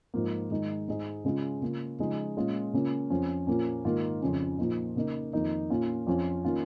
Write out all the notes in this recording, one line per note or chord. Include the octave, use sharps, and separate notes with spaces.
G#2 F3 A#3
G#2 D#3 G#3 D#4
G#2 G#3 D#4
C#3 G#3 C#4 F4
C#3 A#3 F4
C#3 F3 G#3 D#4
A#2 G#3 C#4 F4
C#3 A#3 C#4 F4
F2 F3 C#4
A#2 F3 A#3 C#4
G#2 D#3 A#3 F4
F2 C#3 F3 C#4 F4
A#2 F3 A#3 D#4
C#3 A#3 D#4
F2 D#3 A#3 D#4
A#2 A#3 C#4 F4
F2 F3 C#4 F4
D#3 A#3 C#4 F4